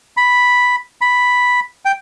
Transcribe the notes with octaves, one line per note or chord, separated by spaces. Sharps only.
B5
B5
G5